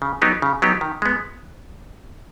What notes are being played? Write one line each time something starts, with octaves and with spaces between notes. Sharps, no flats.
C#3
F#3 B3 D#4 G4
C#3
F#3 B3 D#4 G4
D#3
G#3 B3